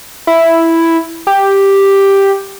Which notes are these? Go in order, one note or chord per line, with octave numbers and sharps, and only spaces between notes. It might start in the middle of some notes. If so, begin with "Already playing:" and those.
E4
G4